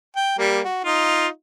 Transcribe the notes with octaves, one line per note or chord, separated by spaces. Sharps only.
G5
G3 A#3
F#4
D#4 F4